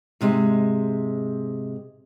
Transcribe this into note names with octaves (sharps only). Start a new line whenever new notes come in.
G#2 C3 G#3